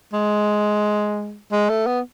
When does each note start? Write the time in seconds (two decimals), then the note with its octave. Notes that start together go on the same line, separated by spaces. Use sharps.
0.13 G#3
1.52 G#3
1.69 A3
1.86 B3